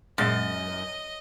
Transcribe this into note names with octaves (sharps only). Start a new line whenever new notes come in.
F#2 A#2 G#3 D#5 A6